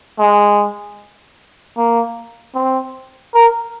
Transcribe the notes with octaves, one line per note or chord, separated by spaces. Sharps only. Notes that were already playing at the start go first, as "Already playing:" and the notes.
G#3
A#3
C4
A#4